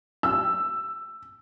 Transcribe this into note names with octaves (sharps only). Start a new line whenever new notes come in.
E6